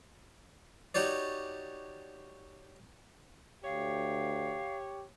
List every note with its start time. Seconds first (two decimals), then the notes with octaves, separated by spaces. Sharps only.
0.95 D#4 F#4 G4 C#5 D5
3.64 D2 G4 C#5 F5